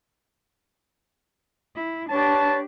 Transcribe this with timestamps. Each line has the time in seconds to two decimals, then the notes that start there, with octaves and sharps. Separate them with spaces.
1.76 E4
2.10 D4 G4 B4 C#5 A5